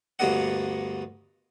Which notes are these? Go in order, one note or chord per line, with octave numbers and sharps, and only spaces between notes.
D2 G2 A#3 B3 D#5 F#5